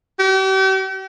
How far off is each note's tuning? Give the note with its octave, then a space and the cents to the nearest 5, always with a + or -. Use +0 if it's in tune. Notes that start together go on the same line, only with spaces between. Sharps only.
G4 -40